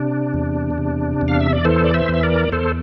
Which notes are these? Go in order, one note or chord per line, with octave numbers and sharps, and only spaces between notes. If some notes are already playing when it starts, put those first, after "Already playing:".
Already playing: C3 D4
E2
C3
E2
F5
E5
D5
E3 A4 C5
D5
C5 E5
E2
E5
A#4 D5
E2 A4 C5